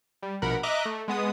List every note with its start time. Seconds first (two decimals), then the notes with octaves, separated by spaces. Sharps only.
0.22 G3
0.42 A#1 B2 A#4 F#5 B5
0.63 D#5 E5 A#5 D6 F#6
0.85 A3
1.08 G#3 B3 D#6